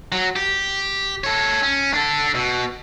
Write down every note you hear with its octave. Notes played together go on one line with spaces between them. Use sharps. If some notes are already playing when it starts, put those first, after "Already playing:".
F#3
G4
A4 C#5
C#4
D4 A4
B2